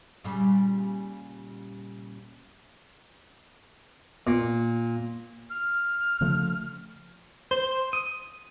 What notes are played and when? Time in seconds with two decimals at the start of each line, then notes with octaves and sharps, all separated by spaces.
0.24 A#2 C#3 G3
4.27 A#2
5.50 F6
6.21 C#3 F3 A3
7.51 C5
7.93 D#6